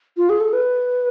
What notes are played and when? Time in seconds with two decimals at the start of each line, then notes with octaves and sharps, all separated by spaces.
0.17 F4
0.30 G#4
0.40 A4
0.53 B4